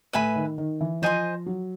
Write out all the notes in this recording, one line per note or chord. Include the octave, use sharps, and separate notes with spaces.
A2 B4 E5 G#5 B5
D#3
D#3
E3
F3 C5 D#5 G#5 C6
F#3